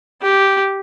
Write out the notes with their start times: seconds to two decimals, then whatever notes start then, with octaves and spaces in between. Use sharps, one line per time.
0.22 G4